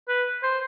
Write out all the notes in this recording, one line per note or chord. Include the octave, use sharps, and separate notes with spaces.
B4
C5